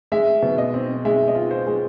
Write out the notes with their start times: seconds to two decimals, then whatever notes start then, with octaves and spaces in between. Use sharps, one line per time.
0.12 G#3 E5
0.42 B2
0.58 D#5
0.74 C4
1.05 G#3 E5
1.28 D#5
1.35 F4
1.51 C5
1.66 G#3